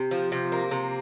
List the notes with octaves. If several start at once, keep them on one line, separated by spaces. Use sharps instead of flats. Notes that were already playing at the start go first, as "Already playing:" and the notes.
Already playing: C3
F3
C3
A#3
C3